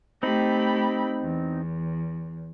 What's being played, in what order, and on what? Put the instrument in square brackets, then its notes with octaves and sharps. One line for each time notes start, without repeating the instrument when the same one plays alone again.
[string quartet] A3 G4 B5 [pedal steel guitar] C4 D#4
[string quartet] E2